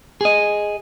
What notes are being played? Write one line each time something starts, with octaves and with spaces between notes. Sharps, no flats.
G#4 D#5